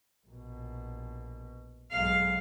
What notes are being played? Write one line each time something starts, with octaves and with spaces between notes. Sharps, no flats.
A#1 B2
B1 G#2 F5